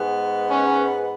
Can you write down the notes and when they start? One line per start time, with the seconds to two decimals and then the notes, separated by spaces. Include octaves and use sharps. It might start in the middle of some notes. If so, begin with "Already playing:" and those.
Already playing: G#2 G#3 B3
0.50 C#4